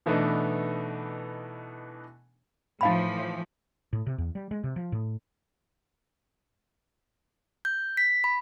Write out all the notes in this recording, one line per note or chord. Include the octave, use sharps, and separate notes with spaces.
B2 E3 A3 B3 D4 D#4
A2 E3 F3 D#4 F5 B5
A2
C3
E2
G3
G#3
C3
F3
A2
G6
B6
B5